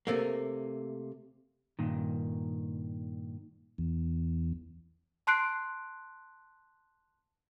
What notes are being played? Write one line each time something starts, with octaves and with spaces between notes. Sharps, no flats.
C3 A3 A#3
G2 A#2 D#3
E2
A5 C6 F#6 C7 D7